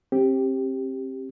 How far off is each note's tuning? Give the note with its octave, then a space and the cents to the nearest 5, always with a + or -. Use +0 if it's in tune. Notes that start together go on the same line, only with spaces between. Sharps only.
C4 +30 G4 +0